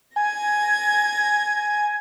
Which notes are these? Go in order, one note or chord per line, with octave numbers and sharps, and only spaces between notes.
G#5 G#6 A#6